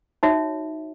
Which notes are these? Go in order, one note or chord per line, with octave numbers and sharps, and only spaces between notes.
D#4 F#4 C#5 E5